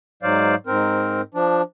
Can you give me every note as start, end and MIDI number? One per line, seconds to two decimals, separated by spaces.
0.23 0.55 44
0.23 0.55 54
0.23 0.55 72
0.23 0.55 74
0.23 0.55 77
0.67 1.21 44
0.67 1.21 60
0.67 1.21 70
1.34 1.62 53
1.34 1.62 62